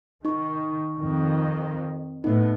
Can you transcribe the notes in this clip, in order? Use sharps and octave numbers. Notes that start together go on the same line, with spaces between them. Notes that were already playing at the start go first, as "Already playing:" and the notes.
D#3 D#4 C#6
F2 D#3
A2 B3 D#4